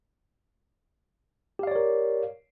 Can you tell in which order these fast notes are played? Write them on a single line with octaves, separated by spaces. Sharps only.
G4 F5 D5 C#5 A#4